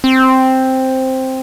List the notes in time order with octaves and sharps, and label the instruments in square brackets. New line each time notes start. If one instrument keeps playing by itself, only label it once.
[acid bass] C4